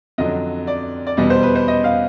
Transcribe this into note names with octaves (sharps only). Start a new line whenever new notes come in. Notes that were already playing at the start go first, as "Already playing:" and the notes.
F2 D3 F#3 D#5
D5
D5
E2 B2 G3 D#5
C5
B4
C5
D#5
F5